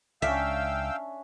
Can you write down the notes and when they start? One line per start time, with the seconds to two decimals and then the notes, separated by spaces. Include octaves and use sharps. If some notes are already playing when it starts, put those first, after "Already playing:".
0.22 C#2 C#4 D4 E5 F5 G5 E6